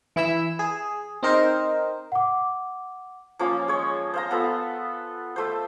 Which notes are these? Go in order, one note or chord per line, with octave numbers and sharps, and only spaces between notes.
E3 E4 E5 E6
G#4
C4 D#4 A#4 C5
F#5 D6
F3 A#3 C#4 F4
G#3 C#5
C5 F5 A#5
B3 F4 A4
A3 C5